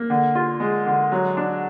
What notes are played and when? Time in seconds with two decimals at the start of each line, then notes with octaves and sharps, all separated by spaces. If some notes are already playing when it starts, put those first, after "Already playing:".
Already playing: A#3
0.10 D3
0.35 F4
0.60 G#3
0.87 D3
1.12 F#3
1.37 D4